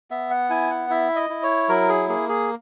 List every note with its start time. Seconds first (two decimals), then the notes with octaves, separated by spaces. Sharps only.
0.11 B3 E5
0.30 F#5
0.50 E4 G#5
0.70 F#5
0.90 E4 E5
1.16 D#5
1.30 E4
1.43 C#5
1.69 F#3 A#4
1.89 G#4
2.09 A#3 G#4
2.29 G#4